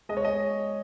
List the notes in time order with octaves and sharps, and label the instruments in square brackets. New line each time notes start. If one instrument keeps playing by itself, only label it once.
[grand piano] G#3 D#5
C#5
G#3 D#5